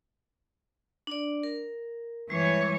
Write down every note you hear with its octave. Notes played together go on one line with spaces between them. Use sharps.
D4 D5
A#4
E3 G3 G#3 C#5